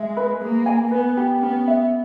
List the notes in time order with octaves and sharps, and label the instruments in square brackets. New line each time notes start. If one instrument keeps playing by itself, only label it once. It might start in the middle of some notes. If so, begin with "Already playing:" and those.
Already playing: [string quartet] G#3 [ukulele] E5
[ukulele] B4
[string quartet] A#3 [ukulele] G#4
[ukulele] G#5
[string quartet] B3 [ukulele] B4
[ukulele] G4
[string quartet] B3 [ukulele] C#4
[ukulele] E5